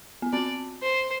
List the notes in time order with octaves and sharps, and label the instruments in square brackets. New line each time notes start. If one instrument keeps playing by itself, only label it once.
[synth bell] B3
[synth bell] C4 [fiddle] D5
[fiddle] C5